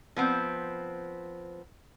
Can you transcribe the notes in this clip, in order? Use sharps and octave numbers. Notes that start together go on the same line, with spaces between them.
F3 B3 C4